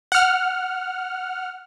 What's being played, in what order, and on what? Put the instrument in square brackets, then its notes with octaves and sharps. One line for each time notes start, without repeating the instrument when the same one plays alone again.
[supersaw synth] F#5 F6